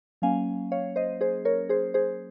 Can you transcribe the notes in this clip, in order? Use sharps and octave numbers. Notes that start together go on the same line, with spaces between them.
F#3 A#3 C#4 F5 G#5
C#5 F5
C5 D#5
G#4 C5
A#4 C#5
G#4 C5
G#4 C5